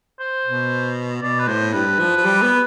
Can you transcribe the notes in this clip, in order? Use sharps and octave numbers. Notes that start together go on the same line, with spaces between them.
C5
B2
B2 D5
B4
A2 C5
G2 B4
F3
F3
G3
B3